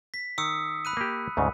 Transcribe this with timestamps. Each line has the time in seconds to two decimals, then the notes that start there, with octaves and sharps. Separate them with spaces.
0.14 B6
0.38 D#3 D#6 E6 C#7
0.85 B5 F#6 D#7
0.97 A#3 G4
1.37 D2 G#2 C#3